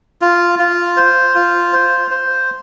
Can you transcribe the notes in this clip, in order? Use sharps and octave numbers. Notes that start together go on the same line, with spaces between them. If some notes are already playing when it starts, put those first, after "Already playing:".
F4
F4
C5
F4
C5
C5